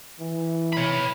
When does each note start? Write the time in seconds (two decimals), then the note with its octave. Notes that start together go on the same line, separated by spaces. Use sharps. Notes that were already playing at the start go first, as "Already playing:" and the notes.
0.20 E3
0.73 C#5 B5